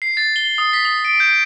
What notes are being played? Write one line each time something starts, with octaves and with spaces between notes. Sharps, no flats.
C7
A6
G7
D#6
B6
D#6
D7
G6